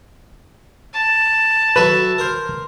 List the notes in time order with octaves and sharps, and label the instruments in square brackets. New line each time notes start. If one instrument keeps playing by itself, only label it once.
[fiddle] A5
[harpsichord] F#3 A4 E5 [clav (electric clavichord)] B4
[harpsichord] A#4 C5